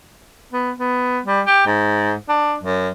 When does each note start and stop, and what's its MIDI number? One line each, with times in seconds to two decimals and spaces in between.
0.53 0.72 59
0.80 1.19 59
1.25 1.41 55
1.46 1.63 67
1.66 2.14 44
2.29 2.55 62
2.63 2.90 42